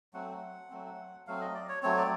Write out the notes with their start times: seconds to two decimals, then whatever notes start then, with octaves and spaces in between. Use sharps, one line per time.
0.13 F#3 A3 C4 F#5
0.70 F#3 A3 C4
1.27 F#3 A3 C4 F5
1.41 D#5
1.54 D5
1.69 C#5
1.83 F#3 A3 C4 C#5
1.98 D5